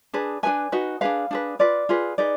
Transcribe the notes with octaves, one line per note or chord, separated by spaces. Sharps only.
D4 G#4 B4
D4 G#4 B4 G#5
D#4 F#4 B4
D4 G#4 B4 F5
D4 G#4 B4
F4 B4 D5
F4 G#4 B4
D#4 G#4 B4 D5